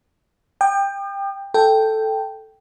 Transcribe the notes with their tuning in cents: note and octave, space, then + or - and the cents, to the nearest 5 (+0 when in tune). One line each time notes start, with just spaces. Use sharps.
G5 +15 D#6 -45
A4 +0 G5 +0